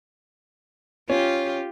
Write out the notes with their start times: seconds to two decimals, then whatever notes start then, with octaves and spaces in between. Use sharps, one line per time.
1.09 C#4 F4 G4